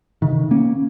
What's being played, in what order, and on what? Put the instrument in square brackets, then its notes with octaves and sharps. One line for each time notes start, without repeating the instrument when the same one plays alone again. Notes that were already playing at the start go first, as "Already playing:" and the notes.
[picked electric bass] C3 D#3
A#3 C#4